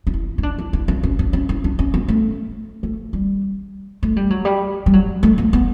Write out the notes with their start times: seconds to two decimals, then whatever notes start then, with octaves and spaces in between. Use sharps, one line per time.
0.07 D4
0.14 E4
0.38 E4
0.43 D4
0.58 E4
0.73 E4
0.88 D4
1.03 C#4
1.19 D4
1.33 C#4
1.49 E4
1.64 D4
1.79 C#4
1.94 B3
2.08 A3
2.83 A3
3.13 G3
4.03 A3
4.16 G3
4.30 F#3
4.45 G3
4.86 G3
4.93 F#3
5.23 A3
5.38 B3
5.53 B3